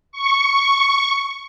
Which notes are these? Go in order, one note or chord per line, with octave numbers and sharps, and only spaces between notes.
C#6